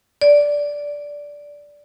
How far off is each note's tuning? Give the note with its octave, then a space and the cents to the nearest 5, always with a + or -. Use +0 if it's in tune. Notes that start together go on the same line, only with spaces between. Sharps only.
D5 -10